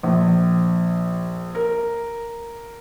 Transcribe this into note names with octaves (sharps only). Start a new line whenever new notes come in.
A#1
A#4